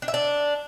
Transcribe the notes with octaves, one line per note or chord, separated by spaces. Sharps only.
D4
E5
D4